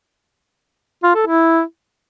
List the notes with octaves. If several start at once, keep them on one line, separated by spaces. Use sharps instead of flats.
F4
A4
E4